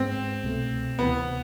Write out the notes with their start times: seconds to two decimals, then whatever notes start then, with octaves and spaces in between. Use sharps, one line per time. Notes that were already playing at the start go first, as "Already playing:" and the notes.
Already playing: G#2 G#3 B3 C4
0.43 C2 B2 A3
0.99 D2 C3 E3 B3